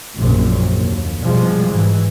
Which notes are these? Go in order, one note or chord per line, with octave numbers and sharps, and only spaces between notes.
A#1 F#2 C3
D#2
B2 F3 G3 G#3
G#2 E3